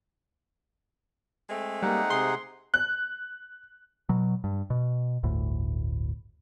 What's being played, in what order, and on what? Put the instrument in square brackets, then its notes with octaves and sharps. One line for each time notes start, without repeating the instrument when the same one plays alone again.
[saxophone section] G#3 A3 C4
[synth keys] G3 A#3 [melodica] D#4 F#5
[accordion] C3 G#4 [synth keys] C6
[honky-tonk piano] F#6
[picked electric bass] B2 F#3
G2
B2
G1 D2 A2